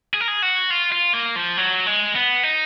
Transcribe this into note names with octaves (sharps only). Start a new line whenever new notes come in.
G#4
A#4
G#4
F#4
F4
F4
A#3
F3
F#3
G#3
B3
D#4